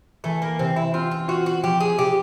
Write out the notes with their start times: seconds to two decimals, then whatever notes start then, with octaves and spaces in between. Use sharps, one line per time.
0.24 E3 A3
0.42 A#3
0.59 C3 C4
0.76 E4
0.94 C4 F4
1.11 F4
1.28 F4 F#4
1.46 F#4
1.63 F3 G4
1.80 G#4
1.98 C3 G4